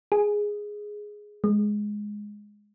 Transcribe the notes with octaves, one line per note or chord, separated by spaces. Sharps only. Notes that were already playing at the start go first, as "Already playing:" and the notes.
G#4
G#3